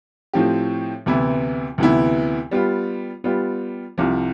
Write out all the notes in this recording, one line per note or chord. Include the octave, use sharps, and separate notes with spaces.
A2 F3 C4 G4
D2 C3 E3 B3 E4
D2 C3 E3 B3 E4
G3 B3 F4
G3 B3 F4
C2 C3 F3